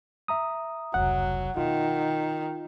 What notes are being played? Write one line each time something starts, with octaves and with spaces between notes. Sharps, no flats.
E5 A#5 D#6
F1 C#2 F#3 F#5
B2 D#3 F4